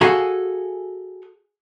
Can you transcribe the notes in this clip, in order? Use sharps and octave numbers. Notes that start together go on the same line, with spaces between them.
F#4 G#4 A4 F5 G#5